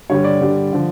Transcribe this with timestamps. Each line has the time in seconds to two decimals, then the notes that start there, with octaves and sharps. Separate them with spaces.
0.09 G2 D3 G3 C#5
0.24 D5
0.40 G2 D3 G3
0.73 D3 F3